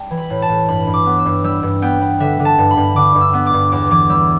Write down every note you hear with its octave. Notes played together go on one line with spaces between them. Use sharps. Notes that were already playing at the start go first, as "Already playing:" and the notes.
Already playing: G3 G5 A5
E3
B5
A2
A5
A2
G2 B5
G2
D6
B3
E6
G2
G3 E6
G2
B3 G5
B3
D3 E5
D3
A5
G2
B5
G2
D3 D6
G2
E6
B3
D6
G2
E2 D6
E3 D6
G3 E6